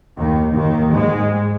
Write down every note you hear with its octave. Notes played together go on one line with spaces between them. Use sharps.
D#2 D#3
D#2 D#3
G#2 G#3